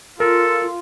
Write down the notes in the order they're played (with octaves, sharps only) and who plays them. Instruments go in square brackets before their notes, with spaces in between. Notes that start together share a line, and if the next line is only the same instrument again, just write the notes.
[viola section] F4 [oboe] A4 [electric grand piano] A#4